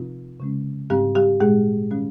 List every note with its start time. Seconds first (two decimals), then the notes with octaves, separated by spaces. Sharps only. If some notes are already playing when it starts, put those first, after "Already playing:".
Already playing: C3 F3 C4 D#4 F4
0.40 C#3 G#3 C#4
0.90 G#2 G3 C4 D#4 G4
1.15 G3 G4
1.40 A#2 G#3 D#4 G#4
1.91 D#3 G3 C#4